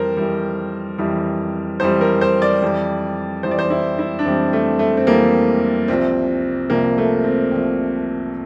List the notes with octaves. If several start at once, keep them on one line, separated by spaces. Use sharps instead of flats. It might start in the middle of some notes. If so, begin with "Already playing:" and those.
Already playing: F2 E3 G3 A#4 C5
F2 E3 G3
F2 E3 G3
F2 E3 G3 C5
A#4
C5
D5
F2 E3 G3
F2 E3 G3 C5
D5
C5
E4
E4
D4
F2 E3 G3 C4
A3
A3
C4
F2 E3 G3 A#3
C2 C3 F3 C4
C2 C3 F3 A#3
A3
C4
C2 C3 F3